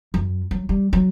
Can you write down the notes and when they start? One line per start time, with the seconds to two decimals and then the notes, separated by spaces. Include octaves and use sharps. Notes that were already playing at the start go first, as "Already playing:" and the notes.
0.14 F#2
0.51 F#3
0.69 G3
0.93 F#3